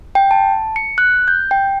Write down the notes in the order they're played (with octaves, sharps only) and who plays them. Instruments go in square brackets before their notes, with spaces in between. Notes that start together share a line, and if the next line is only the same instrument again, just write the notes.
[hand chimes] G5
A5
C#7
F#6
G6
G5